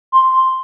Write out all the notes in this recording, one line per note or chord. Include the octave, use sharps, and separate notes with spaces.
C6